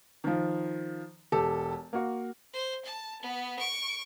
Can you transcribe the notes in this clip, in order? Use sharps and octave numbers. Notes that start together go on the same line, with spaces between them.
D#3 F3
E1 G4 A4
A#3 F#4
C5
A5
B3
C#6 D7